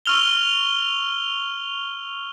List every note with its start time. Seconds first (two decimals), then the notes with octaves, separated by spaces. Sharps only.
0.06 C#6 E6 F6 F7 G7